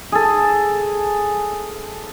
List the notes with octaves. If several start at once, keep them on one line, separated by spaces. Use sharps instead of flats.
G#4 A4